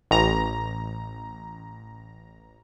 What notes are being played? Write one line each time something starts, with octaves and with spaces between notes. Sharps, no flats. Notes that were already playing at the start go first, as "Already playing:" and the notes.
A1 A#5